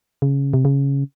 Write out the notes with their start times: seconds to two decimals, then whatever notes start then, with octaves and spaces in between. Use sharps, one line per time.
0.22 C#3
0.54 C3
0.65 C#3